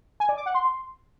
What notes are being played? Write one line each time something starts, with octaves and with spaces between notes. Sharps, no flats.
G#5
D5
D6
F#5
C6